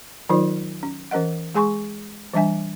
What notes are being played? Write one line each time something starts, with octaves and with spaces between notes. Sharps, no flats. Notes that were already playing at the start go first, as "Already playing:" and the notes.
D#3 F#3 D#4 F4 C5 D5
C#4
E3 C#4 A#4 D#5 F#5
G#3 G#4 G#5 C6 C#6
E3 G3 D4 E5 G#5